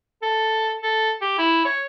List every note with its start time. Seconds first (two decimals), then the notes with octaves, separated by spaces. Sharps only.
0.22 A4
0.83 A4
1.21 G4
1.38 E4
1.65 C#5